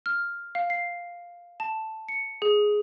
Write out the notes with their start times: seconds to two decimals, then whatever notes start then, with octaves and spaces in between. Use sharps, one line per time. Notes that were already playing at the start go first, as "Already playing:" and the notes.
0.06 F6
0.55 F5
0.70 C7
1.60 A5
2.08 C#7
2.42 G#4